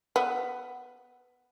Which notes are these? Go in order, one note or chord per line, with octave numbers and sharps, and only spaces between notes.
B3